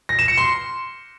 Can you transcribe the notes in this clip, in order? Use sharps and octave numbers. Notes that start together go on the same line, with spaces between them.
A#6
E7
C#7
C6